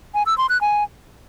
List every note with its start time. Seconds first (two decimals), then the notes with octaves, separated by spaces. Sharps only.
0.14 G#5
0.26 E6
0.38 C6
0.50 F#6
0.61 G#5